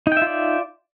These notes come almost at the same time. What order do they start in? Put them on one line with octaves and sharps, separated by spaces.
D#4 G5 E5 F4 D5